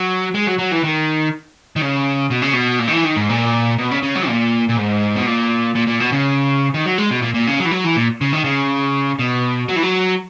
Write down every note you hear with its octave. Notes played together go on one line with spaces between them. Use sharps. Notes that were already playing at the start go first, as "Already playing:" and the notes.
Already playing: F#3
G#3
F#3
F#3
E3
D#3
D#3
C#3
B2
C#3
B2
A#2
D#3
E3
D#3
G#2
A#2
B2
C#3
C#3
F#3
A#2
A#2
G#2
B2
A#2
A#2
A#2
B2
C#3
D#3
F#3
G#3
B2
A#2
A#2
C#3
F#3
E3
F#3
E3
A#2
C#3
D#3
C#3
B2
F#3
E3
F#3